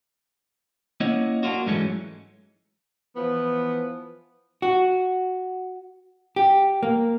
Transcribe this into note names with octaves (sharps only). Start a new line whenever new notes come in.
A#3 C#4 E4 C#5 D#5 F#5
A#3 D4 D#4 F4 F#4
G#2 E3 F#3 G#3 A3 C#4
E3 F3 B3
F#4
G4
A#3